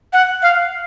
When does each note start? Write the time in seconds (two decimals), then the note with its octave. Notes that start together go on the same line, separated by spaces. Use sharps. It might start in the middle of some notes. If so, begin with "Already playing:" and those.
0.13 F#5
0.42 F5